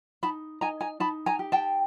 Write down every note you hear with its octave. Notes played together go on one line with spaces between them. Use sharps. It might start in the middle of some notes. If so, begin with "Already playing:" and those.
D#4 A5 B5
D#4 G#5 A#5
G#5 A#5
D#4 A5 B5
G#5 A#5
G4
G5 A5